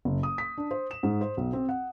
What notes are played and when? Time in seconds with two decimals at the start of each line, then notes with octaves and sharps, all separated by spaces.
0.05 F#1
0.23 D#6
0.38 B6
0.58 D4
0.71 C5
0.91 E7
1.03 G#2
1.21 C5
1.37 B1
1.53 C4
1.69 F#5